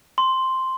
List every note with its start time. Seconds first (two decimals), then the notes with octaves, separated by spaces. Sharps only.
0.18 C6